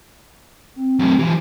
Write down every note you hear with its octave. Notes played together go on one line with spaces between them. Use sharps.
C4
F#2 A3 C4
E3 F3 G4